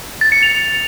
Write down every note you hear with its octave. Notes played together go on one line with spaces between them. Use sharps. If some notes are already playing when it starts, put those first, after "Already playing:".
A6
C#7
F7